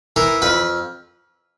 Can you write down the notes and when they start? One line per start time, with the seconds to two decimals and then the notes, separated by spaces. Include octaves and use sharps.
0.16 E3 A#4
0.42 F2 B4